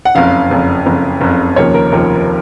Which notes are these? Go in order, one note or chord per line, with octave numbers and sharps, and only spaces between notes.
F#5
F#1 F2 C#3 F5
F#1 F2 C#3
F#1 F2 C#3
F#1 F2 C#3
F1 D#2 C#3 F3 A#3 C#5
A#4
F1 D#2 C#3 F3 A#3 A#4